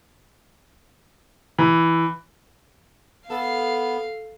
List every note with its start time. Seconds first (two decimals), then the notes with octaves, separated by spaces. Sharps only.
1.59 E3
3.30 B3 A4 F5